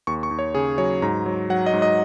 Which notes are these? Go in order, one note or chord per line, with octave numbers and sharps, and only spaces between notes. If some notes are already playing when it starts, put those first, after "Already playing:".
D#2 C#6
C#6
D#2
C#5
C#3 G#4
F#3 C#5
G#2 A#5
F#3
F#3 F#5
D#5
G#2
D#5